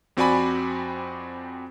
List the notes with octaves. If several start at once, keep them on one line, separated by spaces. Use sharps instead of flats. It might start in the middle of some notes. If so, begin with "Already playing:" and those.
F2 C4 F#4 D5 G#5 B5